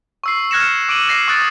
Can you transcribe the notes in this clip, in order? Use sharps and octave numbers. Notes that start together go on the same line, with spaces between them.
C#6 E6 C7
F6 F#6 G#6 A#6 C#7 E7
D6 D7 D#7 F#7
A#6 C7
C#6 D#6 E6 F#6 A6 D7